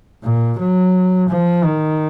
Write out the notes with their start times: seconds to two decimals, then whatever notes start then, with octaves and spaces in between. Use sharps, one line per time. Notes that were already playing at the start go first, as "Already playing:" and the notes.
0.24 A#2
0.59 F#3
1.29 F3
1.64 D#3